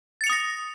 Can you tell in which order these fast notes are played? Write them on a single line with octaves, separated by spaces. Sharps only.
A6 C#7 F7 D#6 A#6